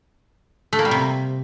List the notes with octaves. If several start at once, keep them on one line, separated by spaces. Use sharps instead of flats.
A3
A#3
G3
C3